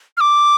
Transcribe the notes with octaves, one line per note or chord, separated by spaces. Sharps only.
F6
D6